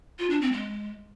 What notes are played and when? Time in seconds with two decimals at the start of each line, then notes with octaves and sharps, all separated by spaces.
0.19 F4
0.30 D4
0.41 C4
0.52 G#3